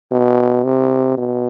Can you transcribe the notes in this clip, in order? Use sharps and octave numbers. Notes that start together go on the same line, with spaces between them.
B2
C3
B2